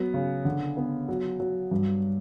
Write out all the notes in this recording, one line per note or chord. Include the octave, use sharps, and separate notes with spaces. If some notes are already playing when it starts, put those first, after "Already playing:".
Already playing: F#3 B3
C#3
D3
B3
F#3
F#3
G2